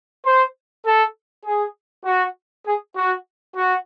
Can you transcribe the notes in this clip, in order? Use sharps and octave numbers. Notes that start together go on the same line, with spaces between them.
C5
A4
G#4
F#4
G#4
F#4
F#4